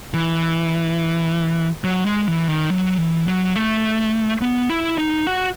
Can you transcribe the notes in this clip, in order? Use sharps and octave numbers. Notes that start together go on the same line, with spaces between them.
E3
F#3
G#3
E3
D#3
F#3
E3
F#3
A3
B3
E4
D#4
F#4